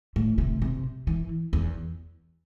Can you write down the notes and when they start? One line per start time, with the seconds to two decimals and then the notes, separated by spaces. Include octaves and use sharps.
0.16 A2
0.38 C3
0.62 C3
1.07 E3
1.53 E2